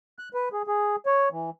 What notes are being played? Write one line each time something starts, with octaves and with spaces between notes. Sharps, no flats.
F#6
B4
G#4
G#4
C#5
E3